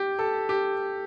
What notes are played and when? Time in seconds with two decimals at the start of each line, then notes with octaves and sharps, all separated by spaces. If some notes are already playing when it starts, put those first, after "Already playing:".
Already playing: G4
0.19 A4
0.49 G4